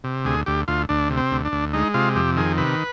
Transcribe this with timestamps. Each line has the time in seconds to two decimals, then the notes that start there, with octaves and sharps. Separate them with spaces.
0.04 C3
0.25 D2 G#4
0.46 D2 G4
0.68 D2 F4
0.89 D2 D4
1.10 C3
1.17 C4
1.31 D2
1.45 D4
1.52 D2
1.73 G#3 D#4
1.94 C3 F4
2.16 F2 G4
2.37 D#3 G#4
2.58 C3 B4